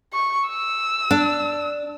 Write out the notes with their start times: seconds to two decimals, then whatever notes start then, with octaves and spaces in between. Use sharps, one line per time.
0.13 C#6
0.49 E6
1.11 D4